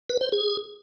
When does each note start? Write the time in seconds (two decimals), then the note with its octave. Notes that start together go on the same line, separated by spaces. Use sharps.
0.10 B4
0.21 C5
0.32 G#4